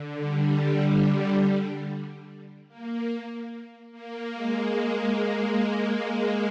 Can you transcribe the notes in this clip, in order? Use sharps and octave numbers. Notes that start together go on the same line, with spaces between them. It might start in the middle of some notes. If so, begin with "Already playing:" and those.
Already playing: D3
G3
A#3
A#3
G#3